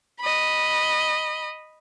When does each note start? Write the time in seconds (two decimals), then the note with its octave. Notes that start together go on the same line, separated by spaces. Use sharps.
0.20 D#5 B5